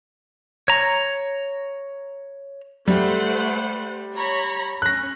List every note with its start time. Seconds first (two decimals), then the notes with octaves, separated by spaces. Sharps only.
0.68 C#5 A#5
2.88 G3 A3 C5 F#5
4.15 C#5 A#5 B5
4.82 C#4 F#6 A#6